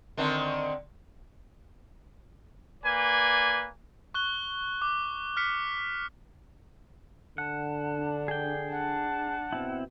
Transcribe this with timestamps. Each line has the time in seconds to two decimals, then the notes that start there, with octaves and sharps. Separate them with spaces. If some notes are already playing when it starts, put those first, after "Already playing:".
0.17 D3 D#3 C4
2.84 A#3 B4 D5 G#5
4.14 C#6 F#6 G7
4.82 D6
5.37 F6 B6 C#7
7.38 D3 F#5 A5
7.97 D4
8.28 G#4 G5
8.72 D4 F#5 A5
9.53 B2 C4 E4